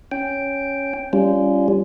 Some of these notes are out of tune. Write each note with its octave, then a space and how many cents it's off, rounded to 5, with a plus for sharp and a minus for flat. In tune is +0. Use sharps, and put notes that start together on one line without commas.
C#4 +0 G5 +0
G3 +0 C#4 +15 F4 -25